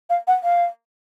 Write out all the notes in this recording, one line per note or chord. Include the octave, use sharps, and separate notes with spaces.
F5
F#5
F5